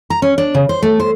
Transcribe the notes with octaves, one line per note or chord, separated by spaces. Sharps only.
A#5
C#4
D4
C#3
C5
A3
C5